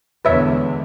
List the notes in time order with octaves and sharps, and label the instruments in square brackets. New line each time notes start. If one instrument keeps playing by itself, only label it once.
[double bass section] E2 D3 G#3 [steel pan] B4 C#5 E5